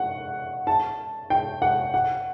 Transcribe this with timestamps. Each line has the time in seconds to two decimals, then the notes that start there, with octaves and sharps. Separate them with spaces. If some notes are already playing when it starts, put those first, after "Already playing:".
Already playing: F#5
0.67 A5
1.30 G5
1.62 F#5
1.94 F#5